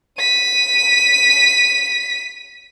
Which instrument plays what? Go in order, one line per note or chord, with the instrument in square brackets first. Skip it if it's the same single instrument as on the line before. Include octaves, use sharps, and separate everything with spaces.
[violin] B6 D#7